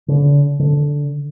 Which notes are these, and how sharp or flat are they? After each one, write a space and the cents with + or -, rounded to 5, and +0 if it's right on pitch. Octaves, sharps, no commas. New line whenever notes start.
D3 -40
D3 -10